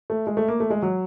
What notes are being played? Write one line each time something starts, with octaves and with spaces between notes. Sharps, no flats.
A3
G#3
A3
A#3
A3
G#3
F#3